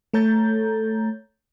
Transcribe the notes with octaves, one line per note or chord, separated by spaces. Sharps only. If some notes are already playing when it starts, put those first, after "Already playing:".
A3 A4 C#5 A#5 G6 A6